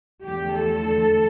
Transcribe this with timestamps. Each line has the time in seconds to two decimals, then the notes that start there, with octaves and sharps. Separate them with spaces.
0.24 E2 D3 F3 A3 G4
0.56 A4